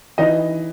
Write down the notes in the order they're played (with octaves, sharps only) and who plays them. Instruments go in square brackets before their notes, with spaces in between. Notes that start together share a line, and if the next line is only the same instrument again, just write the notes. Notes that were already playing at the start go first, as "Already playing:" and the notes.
[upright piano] E3 D#4 D#5